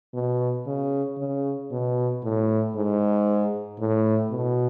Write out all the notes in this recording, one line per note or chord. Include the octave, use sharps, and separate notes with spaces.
B2
C#3
C#3
B2
A2
G#2
A2
B2